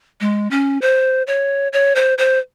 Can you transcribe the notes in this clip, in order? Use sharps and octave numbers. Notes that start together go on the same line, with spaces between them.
G#3
C#4
C5
C#5
C#5
C5
C5